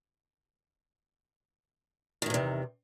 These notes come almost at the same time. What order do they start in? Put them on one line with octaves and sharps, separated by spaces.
D#3 A2 E2 C3